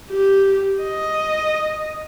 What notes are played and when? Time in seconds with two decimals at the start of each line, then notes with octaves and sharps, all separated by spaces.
0.11 G4
0.83 D#5